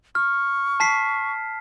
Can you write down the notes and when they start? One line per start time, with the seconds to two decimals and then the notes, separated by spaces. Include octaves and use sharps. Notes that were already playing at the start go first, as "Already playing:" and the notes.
0.15 C#6 F6
0.80 A5 B6 C7